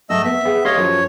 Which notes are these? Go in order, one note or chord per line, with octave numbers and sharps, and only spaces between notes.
G#2 F#3 A3 F#4 D#5 E6
B3 E5
B3 G#4 F5 G5
G4 A4 C#5 D#5 F5 C6
F#2 F3